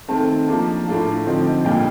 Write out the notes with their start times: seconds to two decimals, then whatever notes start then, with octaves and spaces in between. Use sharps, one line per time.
0.09 D#3 A3 C4 A5
0.48 F3 A#3 D4
0.88 A2 A3 D4 F4
1.27 D3 F3 C4 D#4
1.65 A#2 G3 D4 F4 G5